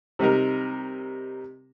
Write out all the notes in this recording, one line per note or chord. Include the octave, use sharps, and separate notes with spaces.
C3 G3 D#4 A#4